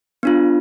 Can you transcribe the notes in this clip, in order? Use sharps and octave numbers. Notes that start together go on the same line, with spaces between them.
B3 D4 F4